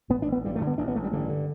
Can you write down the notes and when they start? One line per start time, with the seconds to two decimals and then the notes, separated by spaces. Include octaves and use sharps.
0.10 A1 B3
0.22 D4
0.28 A1 B3
0.45 G2 G3
0.56 A3
0.61 D3
0.67 B3
0.78 A1 D4
0.88 B3
0.95 A1 A3
1.04 G3
1.12 G2 D3
1.29 D3